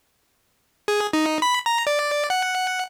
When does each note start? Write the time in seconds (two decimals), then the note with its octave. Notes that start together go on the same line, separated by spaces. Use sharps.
0.88 G#4
1.13 D#4
1.42 B5
1.66 A#5
1.87 D5
2.30 F#5